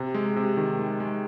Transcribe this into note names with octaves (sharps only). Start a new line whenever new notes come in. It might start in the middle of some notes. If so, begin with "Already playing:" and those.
Already playing: C3
G#3
C3
D#3
G#3
G#3